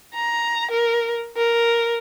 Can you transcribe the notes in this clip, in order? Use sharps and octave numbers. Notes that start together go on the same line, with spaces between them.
A#5
A#4
A#4